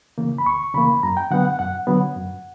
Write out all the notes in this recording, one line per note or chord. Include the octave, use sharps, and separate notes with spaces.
C#3 E3 A#3
B5
D2 C#6
C#3 E3 A#3 B5
F#2 A#5
G5
D3 F#3 B3 F#5
F#5
F#2 F#5
D3 F#3 B3
F#2